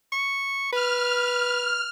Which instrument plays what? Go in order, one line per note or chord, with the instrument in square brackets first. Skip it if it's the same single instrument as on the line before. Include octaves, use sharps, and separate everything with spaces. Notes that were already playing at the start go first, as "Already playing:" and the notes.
[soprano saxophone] C#6
[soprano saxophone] B4 [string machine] F6